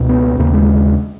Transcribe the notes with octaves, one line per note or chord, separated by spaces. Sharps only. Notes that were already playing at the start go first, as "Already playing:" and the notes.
Already playing: C#2 B2
B3
D#2 C#3 A#3
G#3